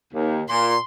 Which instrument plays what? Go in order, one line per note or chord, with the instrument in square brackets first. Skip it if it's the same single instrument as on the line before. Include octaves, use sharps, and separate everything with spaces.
[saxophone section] D#2
[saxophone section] A#2 [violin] C6